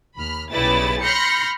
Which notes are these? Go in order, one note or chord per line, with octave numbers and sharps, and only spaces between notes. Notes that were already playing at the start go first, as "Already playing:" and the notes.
D#2 B5 F6
B1 C#3 G3 E4 B4 A6
B5 C6 F6 G6 A#6 C#7